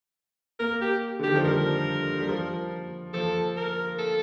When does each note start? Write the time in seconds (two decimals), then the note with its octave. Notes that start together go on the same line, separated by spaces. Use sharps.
0.59 A#3 A#4
0.81 G4
1.19 D3
1.23 D#3 G4
1.35 F3
1.44 G3 A#4
2.20 G3
2.29 F3
3.13 F3 A4
3.57 A#4
3.98 A4